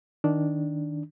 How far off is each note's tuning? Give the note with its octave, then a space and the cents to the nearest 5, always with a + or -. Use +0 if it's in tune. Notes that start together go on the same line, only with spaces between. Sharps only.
D#3 +0 D4 -10